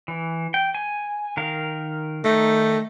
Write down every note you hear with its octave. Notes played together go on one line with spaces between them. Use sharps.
E3
G5
G#5
D#3 A#4 F5
D#3 A3 D#4